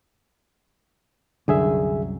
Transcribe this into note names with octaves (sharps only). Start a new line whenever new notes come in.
C2 F#2 D3 G#4 E5